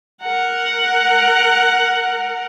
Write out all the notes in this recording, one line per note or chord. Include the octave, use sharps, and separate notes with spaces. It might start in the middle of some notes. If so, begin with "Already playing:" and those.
A#4 F#5